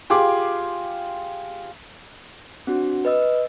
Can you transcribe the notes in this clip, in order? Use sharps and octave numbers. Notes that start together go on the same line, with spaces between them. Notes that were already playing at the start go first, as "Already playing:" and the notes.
F4 G4 G#4 D6
C4 D4 F#4
B4 D#5 E6